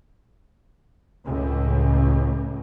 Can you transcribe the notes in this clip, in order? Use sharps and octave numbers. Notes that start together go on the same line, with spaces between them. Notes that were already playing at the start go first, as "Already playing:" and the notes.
C#2 A2